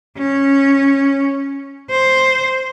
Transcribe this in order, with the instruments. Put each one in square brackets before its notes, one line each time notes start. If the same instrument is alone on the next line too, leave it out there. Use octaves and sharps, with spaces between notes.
[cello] C#4
C5